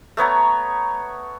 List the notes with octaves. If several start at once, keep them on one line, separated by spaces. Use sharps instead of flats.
A3 B3 C#5 A#5